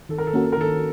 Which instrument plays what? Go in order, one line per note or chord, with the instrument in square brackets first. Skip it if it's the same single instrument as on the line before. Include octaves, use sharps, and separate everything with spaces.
[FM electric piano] D#3 [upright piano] A4
[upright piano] A#4
A4
[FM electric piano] A#3 C#4 F#4 [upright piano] A#4
[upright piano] A4
A#4
[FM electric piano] D#3 [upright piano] A4